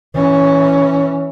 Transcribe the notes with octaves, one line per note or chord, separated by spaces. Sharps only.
E3 C#4